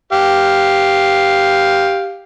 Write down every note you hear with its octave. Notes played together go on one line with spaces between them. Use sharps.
G4 F5